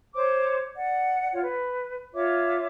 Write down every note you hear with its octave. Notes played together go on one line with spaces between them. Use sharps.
C5 C#5 D6
D5 F#5
F4 C#5 F#5
B4
F4 C#5 E5 D6